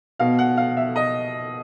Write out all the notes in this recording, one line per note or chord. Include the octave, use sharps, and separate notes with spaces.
B2 F5
F#5
F5
E5
D#5